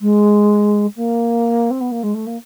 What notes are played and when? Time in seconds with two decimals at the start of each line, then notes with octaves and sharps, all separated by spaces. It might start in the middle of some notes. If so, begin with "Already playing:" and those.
0.01 G#3
0.96 A#3
1.70 C4
1.80 B3
1.91 A#3
2.03 G#3
2.14 A3
2.26 A#3